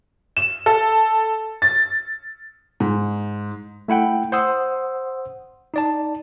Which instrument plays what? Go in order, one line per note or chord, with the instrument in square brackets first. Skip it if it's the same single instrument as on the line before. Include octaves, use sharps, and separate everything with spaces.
[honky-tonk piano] E7
A4
A6
[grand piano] G#2
[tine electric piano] A3 E4 F#5 G5
C5 F#5 C6 D#6 E6
D#4 D5 A5